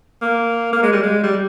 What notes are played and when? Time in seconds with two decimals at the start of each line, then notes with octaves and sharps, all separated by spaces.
0.22 A#3
0.73 A#3
0.83 G#3
0.92 G3
1.03 G#3
1.23 G3